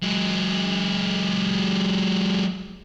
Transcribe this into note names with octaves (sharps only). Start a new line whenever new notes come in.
F#3 G#3